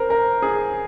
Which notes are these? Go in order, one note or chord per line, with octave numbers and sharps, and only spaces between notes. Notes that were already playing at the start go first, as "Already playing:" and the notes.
Already playing: A#4 C5
A#4
G#4